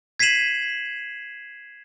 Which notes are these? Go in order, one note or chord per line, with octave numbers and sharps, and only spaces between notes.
G#6 B6 C7 D#7 E7 F#7